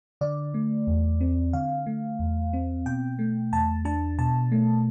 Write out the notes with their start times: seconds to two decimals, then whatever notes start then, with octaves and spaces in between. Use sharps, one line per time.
0.21 D3 D5
0.54 A3
0.87 E2
1.21 C4
1.53 D3 F5
1.86 A3
2.19 E2
2.53 C4
2.86 B2 G5
3.19 A3
3.52 E2 A5
3.85 D4 A5
4.18 B2 A5
4.52 A3